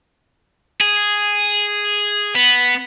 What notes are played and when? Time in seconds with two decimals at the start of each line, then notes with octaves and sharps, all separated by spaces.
0.80 G#4
2.35 B3